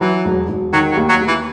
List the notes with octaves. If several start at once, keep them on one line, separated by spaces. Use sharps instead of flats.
E3 F#3
E1
E1
D#3 F#3
F#3
D#2
F#3
D#2
E3